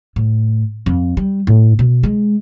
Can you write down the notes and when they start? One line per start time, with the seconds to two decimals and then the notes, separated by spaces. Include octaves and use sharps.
0.16 A2
0.86 F2
1.17 G3
1.47 A2
1.79 B2
2.03 G#3